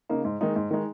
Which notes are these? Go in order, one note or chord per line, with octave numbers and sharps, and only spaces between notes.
C#3 A#3 D#4
G#2
D#3 G#3 D#4
G#2
D#3 G#3 D#4